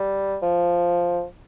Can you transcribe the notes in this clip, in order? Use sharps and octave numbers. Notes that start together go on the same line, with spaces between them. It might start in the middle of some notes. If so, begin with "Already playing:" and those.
Already playing: G3
F3